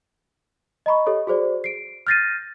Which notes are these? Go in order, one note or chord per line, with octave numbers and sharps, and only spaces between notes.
D#5 A#5 B5 C#6
G4 A4 C#5 D#5
F#4 G#4 C5 D5
C7 D7
F6 G6 A6 A#6 C7 D#7